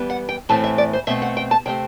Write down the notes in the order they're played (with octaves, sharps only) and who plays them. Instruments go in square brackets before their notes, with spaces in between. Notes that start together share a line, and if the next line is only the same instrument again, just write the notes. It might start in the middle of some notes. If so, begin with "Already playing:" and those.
Already playing: [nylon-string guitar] E3 G3 B3
F#5
G5
A2 E3 A3 C4 A5
E5
D5
C5
B2 A3 C4 E5
F#5
G5
A5
C3 F#3 A3 C4 G5